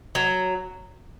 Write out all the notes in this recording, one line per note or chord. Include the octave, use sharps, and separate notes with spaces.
F#3